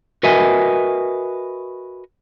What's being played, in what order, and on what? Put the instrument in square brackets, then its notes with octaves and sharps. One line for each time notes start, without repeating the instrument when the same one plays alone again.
[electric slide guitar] F#4 A#4 B4 D#5 E5 G#5